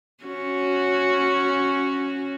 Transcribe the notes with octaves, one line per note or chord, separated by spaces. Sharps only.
C#4 F#4